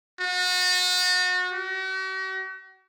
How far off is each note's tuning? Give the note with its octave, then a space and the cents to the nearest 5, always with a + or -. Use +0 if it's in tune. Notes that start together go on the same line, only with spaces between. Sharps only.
F#4 -35
F#4 +45